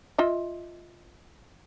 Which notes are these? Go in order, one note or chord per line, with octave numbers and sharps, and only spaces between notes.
F4 D#5 E5